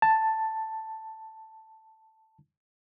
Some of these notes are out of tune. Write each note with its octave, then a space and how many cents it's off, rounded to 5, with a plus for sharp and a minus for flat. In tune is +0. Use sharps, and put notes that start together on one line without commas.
A5 +5